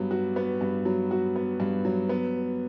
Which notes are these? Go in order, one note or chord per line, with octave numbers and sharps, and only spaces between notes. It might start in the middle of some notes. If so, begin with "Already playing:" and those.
Already playing: G2 F#3 B3
F#4
B3
G2
F#3
F#4
B3
G2
F#3
B3